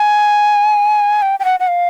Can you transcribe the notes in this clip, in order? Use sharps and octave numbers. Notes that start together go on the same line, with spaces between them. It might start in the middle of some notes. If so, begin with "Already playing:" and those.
Already playing: G#5
G5
G5
F#5
F#5
F5